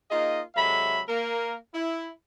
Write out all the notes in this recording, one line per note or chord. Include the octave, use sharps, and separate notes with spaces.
A#3 D#4 F4 G#4 D#5
C3 F#3 G#3 A4 E5 B5
A#3 A#4
E4